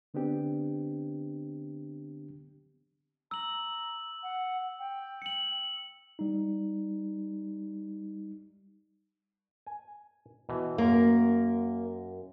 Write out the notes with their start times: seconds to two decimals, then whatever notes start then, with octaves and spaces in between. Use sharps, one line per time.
0.14 D3 B3 C4 D4 G4
3.31 A#5 E6 F#7
4.23 F#5
4.79 G5
5.22 C#7 F#7
6.19 G3 D#4
9.66 G#5
10.49 B2 E3
10.78 F#2 A#3 A#4